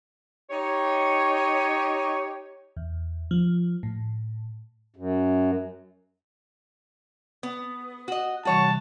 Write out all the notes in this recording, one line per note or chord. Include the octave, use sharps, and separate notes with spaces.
D#4 G4 C#5
E2
F3
A2
F#2
B3
F#4 D#5
C3 E3 G3 F#4 C#5 A5